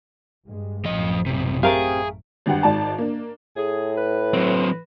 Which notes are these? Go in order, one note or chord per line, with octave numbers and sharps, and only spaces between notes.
G2 G#3
A1 F#2 F3 D#5
B1 C3
A3 C4 G4 G#4 A#4 F5
G#1 G2 G4 F#5
G#1 G#2 D5 A5
A#3 D4
A2 G#4
B4
F#3 C4